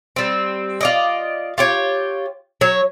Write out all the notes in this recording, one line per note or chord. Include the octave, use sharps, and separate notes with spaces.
G3 C4
F4 D5 D#5
F4 G4 C#5
F#3 C#5